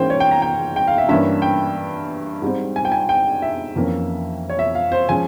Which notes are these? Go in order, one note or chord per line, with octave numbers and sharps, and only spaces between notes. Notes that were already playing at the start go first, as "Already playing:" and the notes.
Already playing: G#2 E3 A#3 C#4 C5 G5
C#5
G5
A#5
G5
G5
F5
E5
G2 E3 A#3 C#4 E5
G5
G#2 G3 C4
G#5
G5
G#5
G5
E5
F2 E3 A#3 C#4
C#5
E5
F5
C5
F3 G#3 C#4 G#5